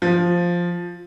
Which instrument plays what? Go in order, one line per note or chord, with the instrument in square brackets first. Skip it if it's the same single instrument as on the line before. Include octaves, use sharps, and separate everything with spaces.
[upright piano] F3